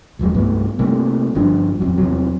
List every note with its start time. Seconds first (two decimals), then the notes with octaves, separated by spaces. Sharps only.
0.19 F1 E2 F#3 G#3
0.34 C2 G2 A3 B3
0.79 C3 G3 A3 A#3
1.35 G1 G2 F3 D4
1.80 D1 F2 F#3
1.98 E2 C3 F#3